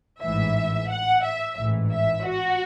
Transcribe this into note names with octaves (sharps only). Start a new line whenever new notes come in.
A1 G#2 E3 E5
F#5
E5
A1 G#2 E3
E5
F#4